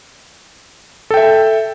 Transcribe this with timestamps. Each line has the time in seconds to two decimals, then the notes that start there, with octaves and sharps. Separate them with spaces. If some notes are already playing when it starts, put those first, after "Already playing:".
1.10 A4
1.14 G5
1.17 E5